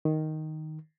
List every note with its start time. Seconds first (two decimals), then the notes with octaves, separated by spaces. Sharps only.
0.05 D#3